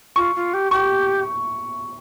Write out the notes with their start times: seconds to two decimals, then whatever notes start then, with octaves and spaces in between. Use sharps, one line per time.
0.16 F4 C#6
0.35 F4
0.54 G4
0.71 G4 C#6